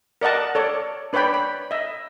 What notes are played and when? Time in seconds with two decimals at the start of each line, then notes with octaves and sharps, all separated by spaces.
0.21 A#4 D5 D#5 F#5 A5
0.55 A4 C#5 D5
1.13 D4 B4 C#5 D5 G5 B5
1.34 B5
1.71 D#5 E5